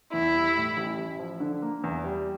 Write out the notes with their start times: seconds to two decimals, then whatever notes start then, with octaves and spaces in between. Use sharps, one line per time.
0.13 E2 E4
0.34 G3
0.56 A2
0.77 A1
0.98 A1
1.19 F3
1.40 D3
1.62 A#3
1.84 E2
2.04 G3